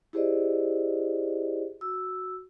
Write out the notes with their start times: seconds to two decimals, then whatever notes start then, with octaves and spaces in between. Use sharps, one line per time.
0.13 E4 G4 G#4 C5 D5 D#5
1.81 F#4 E6